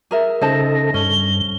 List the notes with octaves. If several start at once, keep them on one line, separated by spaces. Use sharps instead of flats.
G#4 A#4 E5
C#3 D#4 A4 C5 A5 A#6
G2 C#4 G7